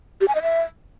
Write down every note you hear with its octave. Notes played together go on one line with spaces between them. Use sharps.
G4
G#5
D#5
E5